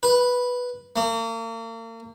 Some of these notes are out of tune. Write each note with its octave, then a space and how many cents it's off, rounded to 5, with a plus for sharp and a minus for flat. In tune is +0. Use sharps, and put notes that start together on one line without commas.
B4 -5
A#3 -40